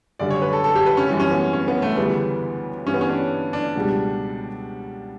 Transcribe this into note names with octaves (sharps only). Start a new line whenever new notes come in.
F#2 D3 G3 D5
C#5
B4
A4
A4
G4
B4
C#4
F#2 E3 G3
C#4
B3
C#4
B3
A3
D2 C#3 E3 G3 B3
G2 E3 G3 C#4
B3
C#4
D4
D4
C#2 B2 G3